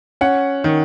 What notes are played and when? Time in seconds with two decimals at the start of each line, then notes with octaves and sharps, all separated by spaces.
0.21 C#4 F#5
0.64 D#3